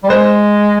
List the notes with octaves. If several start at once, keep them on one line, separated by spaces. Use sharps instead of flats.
G3
G#3 C5